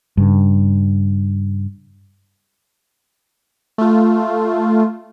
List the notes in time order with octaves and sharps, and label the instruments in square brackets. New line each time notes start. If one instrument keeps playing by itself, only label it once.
[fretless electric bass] G2 C#3
[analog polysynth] A3 F4